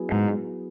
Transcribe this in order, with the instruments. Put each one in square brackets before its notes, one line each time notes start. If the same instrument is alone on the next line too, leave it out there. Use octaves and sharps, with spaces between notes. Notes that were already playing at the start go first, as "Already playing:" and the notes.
Already playing: [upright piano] F#3 B3 E4 G#4
[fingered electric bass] G#2